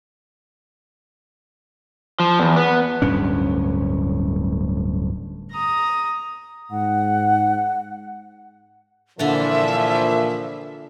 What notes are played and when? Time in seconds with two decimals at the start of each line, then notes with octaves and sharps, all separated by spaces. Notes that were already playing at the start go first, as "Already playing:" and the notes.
2.20 F3
2.40 E2
2.56 B3
3.02 D1 D2 G2 C#4
5.53 A#5 D#6
6.71 G#2 F#5
9.19 A#2 D3 E3 F3 D4 E5